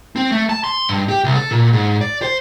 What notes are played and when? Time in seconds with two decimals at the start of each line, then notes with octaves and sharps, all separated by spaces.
0.16 C4
0.32 A3
0.49 A5
0.64 C6
0.89 G2
1.09 G4
1.24 C2
1.36 A4
1.51 A#2
1.73 G#2
2.01 D5
2.22 C5